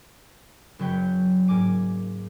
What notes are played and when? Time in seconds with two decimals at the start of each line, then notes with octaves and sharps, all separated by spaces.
0.79 F#1 F#3 B3 C#5 G5 G6
1.48 G#2 A#3 G#5 D6 D7